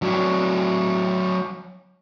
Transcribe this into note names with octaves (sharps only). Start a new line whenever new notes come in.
F#3 D4